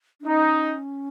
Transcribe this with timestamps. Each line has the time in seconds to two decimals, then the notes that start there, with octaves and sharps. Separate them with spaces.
0.20 D4
0.26 C#4 D#4